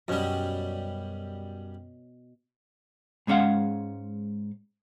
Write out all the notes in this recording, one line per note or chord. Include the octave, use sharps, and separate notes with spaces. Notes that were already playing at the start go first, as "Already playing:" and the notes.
F#2 B2 G3 C#4
G#2 G#3 C#4 F5 F#5